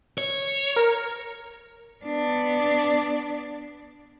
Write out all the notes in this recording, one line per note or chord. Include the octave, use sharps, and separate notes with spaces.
C#5
A#4
B3 D4